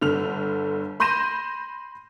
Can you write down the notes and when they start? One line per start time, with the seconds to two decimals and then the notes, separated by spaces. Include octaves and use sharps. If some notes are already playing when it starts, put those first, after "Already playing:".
0.01 G1 D3 F6 F7
1.00 B5 C6 G6 A#6 D#7 E7